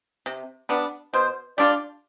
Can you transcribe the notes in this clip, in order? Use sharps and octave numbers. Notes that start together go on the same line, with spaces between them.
C3
G3 B3 D4
B2 C5
G3 D4 F4 D5